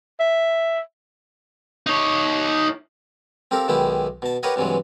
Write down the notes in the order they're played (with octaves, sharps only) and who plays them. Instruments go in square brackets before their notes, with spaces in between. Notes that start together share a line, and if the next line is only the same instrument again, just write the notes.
[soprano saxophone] E5
[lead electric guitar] D#4 C#5
[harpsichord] C4 G4 A4 A#4 F5
B1 D#3 G#3 B3 E4 G4
B2 A5
G4 A#4 B4 C#5 D#5 F#5
G2 C3 E3 F#3 G#3